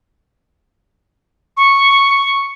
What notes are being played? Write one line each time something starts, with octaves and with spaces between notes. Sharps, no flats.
C#6